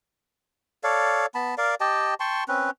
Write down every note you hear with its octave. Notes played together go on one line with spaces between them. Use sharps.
A4 C#5 D5 F5
B3 A5 B5
A#4 D5 F5
G4 D#5 G5 A5
G5 A5 C6 C#6
C4 C#4 B4